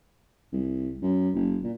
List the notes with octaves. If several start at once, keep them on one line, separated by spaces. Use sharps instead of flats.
C2
F#2
F#1
A#2